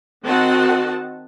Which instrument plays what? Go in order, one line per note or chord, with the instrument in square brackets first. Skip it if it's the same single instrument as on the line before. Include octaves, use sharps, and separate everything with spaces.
[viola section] D#3 C4 F#4 D#5 F#5 A5